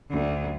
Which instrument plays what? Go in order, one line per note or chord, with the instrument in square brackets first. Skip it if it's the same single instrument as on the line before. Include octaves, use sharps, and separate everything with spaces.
[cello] D2